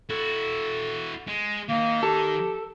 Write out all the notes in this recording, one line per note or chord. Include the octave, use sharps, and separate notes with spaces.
E4 F#4 A4
G#3
D#3 A#3 D#4
G4 A4